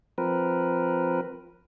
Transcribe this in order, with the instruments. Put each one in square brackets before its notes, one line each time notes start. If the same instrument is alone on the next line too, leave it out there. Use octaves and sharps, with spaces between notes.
[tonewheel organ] F3 C4 A#4 B4